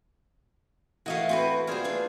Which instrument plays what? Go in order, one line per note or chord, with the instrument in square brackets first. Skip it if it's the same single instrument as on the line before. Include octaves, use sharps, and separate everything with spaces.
[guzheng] E3 A3 [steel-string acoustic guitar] F#4 D#5 F5
[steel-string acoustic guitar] C4 F#4 B4
[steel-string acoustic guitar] B2 G3 [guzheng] F4 G#4 C5
[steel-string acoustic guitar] E3 A3 D4